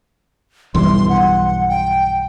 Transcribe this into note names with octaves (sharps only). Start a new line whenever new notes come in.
B1 G2 E3 C6
F#5
G5